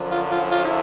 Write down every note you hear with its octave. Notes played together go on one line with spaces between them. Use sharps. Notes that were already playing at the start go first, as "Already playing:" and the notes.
Already playing: F#2 D3 F3
F4
F4
F4
E4